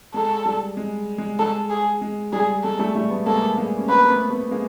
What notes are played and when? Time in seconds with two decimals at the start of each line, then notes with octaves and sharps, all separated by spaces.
0.14 G#3 A4
0.46 G3
0.77 G#3
1.18 G#3
1.39 G#3 A4
1.70 G#4
2.02 G#3
2.33 G3 G#4
2.63 G#3 A4
2.79 G3 A3
2.95 G3 A3
3.11 A3 B3
3.26 G#3 A#3 A4
3.57 G#3 A#3
3.77 C#4
3.89 A#3 C4 B4
4.10 A3 B3
4.30 A3 B3
4.51 G#3 A#3